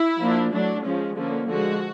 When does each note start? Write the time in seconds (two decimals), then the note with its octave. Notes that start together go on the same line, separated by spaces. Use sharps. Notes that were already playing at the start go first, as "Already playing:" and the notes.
Already playing: E4
0.20 F3 A#3 D4
0.52 F#3 A3 D4
0.84 F3 G#3 C#4
1.16 D3 F3 A#3 C#4
1.48 D3 F3 G#3 F#4